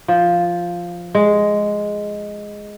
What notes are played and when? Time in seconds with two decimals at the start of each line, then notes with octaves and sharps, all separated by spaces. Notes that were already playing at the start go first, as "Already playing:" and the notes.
0.08 F3
1.15 G#3